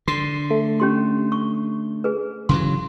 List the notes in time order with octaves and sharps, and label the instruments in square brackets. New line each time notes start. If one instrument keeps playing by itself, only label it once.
[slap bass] D3 [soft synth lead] C6
[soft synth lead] A3
[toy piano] C#4 G4 C6
C#6
G#4 B4
[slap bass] C#3 E3 F#3 [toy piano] C6